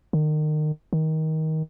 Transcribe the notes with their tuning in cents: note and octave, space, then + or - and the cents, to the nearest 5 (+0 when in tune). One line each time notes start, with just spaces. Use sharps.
D#3 -30
D#3 +20